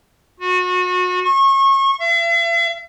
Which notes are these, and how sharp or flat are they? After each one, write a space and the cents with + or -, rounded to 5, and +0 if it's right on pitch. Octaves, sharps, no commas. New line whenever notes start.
F#4 -30
C#6 -30
E5 +45